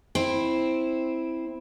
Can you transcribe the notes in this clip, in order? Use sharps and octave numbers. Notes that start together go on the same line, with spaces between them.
C4 E4